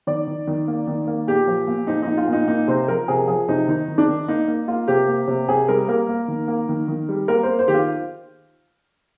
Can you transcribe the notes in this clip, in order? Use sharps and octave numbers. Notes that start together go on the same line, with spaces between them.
D#3 D5
D#3
D#3
A#3
D#3
A#3
A#2 G4
F3
A#2
F3 D#4
A#2 D#4
F4
A#2
D#4
A#3 D#4
C3 C5
F3 A#4
C3 G#4
F3 G#4
C3 D#4
D#3 D#4
D#3
D4
D#3
A#3 D#4
A#3
A#3 F4
C3 G4
A#3
C3
C3 G#4
G3 A#4
A#3 A#4
A#3
D#3
A#3
D#3
D#3
G3
A#3 A#4
C5
A#3
C5
D#3 G4
F4